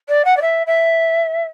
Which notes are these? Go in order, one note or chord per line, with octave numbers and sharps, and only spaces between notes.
D5
F#5
D5
E5
E5